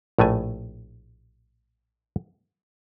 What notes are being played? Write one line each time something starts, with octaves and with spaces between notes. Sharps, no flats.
A#1 A2 A3 G#5